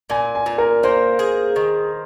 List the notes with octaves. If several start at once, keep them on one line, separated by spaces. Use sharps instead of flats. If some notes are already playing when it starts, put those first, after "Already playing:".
A#2 G#5
G#5
A#2
A#4
A#3 C5
G#4
D#3